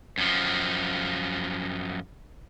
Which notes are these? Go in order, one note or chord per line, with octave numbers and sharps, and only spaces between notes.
F#2 F3